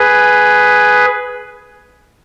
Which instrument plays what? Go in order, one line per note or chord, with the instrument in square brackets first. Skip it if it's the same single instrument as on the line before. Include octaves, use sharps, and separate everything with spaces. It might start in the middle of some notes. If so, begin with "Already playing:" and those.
Already playing: [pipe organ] G#4 B4